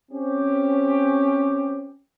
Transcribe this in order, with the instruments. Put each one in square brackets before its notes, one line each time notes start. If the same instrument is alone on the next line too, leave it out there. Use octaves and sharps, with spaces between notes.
[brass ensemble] C4 C#4 G4